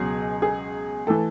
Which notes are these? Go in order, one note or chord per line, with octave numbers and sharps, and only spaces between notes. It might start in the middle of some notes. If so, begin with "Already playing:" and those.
Already playing: C#2 B2 F#3 G#4
G#4
E3 A3 A4